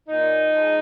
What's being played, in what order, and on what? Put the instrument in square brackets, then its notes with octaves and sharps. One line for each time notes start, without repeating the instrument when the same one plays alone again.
[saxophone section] A#2 D#4
F3 G#3